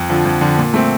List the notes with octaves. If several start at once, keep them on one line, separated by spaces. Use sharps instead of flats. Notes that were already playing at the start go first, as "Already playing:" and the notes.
Already playing: F2
D3 F3
F2
D3 F3
A#2
A3 C4